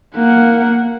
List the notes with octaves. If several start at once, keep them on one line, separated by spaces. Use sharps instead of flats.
A#3 F#5